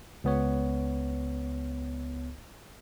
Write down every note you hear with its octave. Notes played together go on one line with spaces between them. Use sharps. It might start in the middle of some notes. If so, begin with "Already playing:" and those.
C#2 B3 C#5